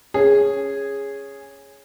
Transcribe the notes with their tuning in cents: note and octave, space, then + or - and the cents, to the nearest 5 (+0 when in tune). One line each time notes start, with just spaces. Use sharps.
C#4 +0 G#4 -10